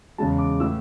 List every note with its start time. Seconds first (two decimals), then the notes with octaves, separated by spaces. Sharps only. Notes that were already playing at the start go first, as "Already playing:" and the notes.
0.18 E2 C#3 G#3 A5
0.38 D6
0.60 A2 E3 E6